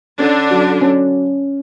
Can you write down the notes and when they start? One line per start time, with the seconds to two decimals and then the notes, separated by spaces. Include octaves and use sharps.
0.18 D3 C#4 D4
0.51 F#3
0.81 C#4